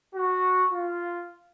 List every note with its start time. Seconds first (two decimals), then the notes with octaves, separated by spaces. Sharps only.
0.16 F#4
0.72 F4